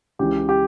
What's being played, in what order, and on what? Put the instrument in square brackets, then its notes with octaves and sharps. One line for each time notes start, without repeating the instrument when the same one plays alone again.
[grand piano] C#2 C#3 E3 G4
G4